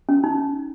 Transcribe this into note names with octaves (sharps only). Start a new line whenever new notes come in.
C#4
D#4